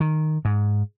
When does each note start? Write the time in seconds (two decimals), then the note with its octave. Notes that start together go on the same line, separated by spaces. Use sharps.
0.01 D#3
0.45 G#2